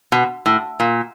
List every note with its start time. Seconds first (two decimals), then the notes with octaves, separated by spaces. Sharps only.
0.12 B2
0.46 A2
0.80 A#2